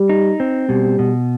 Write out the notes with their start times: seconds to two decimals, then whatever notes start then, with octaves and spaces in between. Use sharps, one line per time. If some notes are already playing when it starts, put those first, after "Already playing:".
Already playing: G3
0.09 D#4
0.40 C4
0.69 B2 G3
0.99 B2